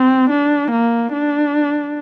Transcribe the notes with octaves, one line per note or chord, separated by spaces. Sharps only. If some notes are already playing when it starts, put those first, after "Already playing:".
Already playing: C4
D4
A#3
D4